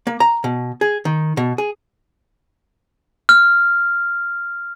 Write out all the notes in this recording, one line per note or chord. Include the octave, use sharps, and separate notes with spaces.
A#3
A#5
B2
G#4
D#3
B2
G#4
F6